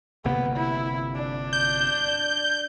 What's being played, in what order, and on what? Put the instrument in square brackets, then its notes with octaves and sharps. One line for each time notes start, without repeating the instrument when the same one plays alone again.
[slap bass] G1 C3 A#3 [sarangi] B3
[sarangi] E4
D4
[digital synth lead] G6